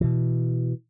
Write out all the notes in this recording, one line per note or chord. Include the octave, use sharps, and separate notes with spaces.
B2 E3